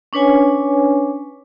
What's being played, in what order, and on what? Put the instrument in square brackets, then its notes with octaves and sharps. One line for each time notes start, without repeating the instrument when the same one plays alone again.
[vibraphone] C#4 D4 B4 C#5 G#5